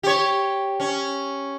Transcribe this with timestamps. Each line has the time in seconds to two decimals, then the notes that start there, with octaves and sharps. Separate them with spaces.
0.03 G4 C#5
0.80 C#4